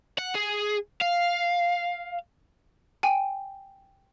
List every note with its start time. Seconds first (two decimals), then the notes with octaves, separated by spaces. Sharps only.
0.19 F#5
0.35 G#4
1.02 F5
3.03 G5 G#5